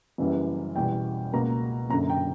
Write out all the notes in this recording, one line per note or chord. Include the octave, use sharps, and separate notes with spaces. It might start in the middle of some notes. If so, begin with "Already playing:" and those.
F#1 F#2 E3 G3 B3
E2 B2 G3 G5
C#2 B2 A#3 A#5
F#1 F#2 D3 A#5
G5